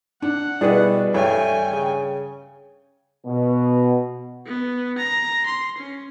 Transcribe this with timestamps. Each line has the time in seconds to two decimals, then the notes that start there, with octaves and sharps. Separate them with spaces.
0.22 D4 F#5
0.61 B2 G3 D4 E4 G#4 B4
1.14 G2 A3 C#5 G5 G#5
1.73 C#3
3.25 B2
4.46 B3
4.98 A#5
5.46 C6
5.78 C#4